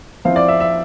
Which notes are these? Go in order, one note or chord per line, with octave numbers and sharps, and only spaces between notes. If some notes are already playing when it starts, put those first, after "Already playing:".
F3 C4 E4 F5
D5
E5
E5